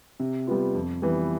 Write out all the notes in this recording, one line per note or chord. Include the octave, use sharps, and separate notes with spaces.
C3
G3 B3 F4
F2
E3 G3 B3